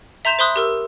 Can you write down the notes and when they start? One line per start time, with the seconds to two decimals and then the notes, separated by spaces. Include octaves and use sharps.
0.25 E5 A#5 C6 G6 E7 F7
0.39 C5 E5 B5 C6 D#6 F#6
0.56 G4 A#4 E6